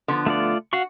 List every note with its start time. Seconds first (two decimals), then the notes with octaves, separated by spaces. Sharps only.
0.08 D3 F3 B3
0.26 A3 F4 D5
0.73 F#4 F5 F#5 C#6